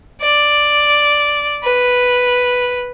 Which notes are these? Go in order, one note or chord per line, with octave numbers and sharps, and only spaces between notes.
D5
B4